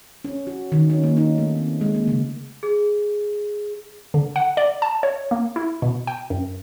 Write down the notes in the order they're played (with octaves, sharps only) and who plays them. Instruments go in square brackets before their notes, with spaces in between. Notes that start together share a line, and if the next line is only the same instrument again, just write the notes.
[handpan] C#4
F#4
D#3
C#4
A#3
D#4
A3
C4
G#3
A#3
C#3
[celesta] G#4
[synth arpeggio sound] D3
F#5
D5
A5
C#5
A#3
E4
B2
G5
F#2